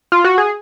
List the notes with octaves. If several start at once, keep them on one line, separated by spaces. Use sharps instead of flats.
F4
F#4
G#4